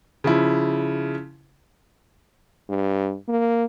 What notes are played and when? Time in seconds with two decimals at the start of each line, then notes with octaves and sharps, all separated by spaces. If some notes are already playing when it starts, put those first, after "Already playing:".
0.24 C#3 F3 E4
2.69 G2
3.29 A#3